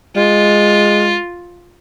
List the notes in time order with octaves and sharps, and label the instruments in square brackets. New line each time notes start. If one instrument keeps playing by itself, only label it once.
[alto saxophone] G#3 [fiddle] F4